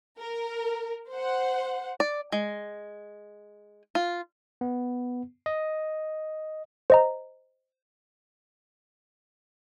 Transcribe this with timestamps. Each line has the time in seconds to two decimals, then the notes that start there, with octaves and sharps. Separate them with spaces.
0.18 A#4
1.10 C5 F#5
2.00 D5
2.32 G#3
3.95 F4
4.61 B3
5.46 D#5
6.90 C5 D#5 A#5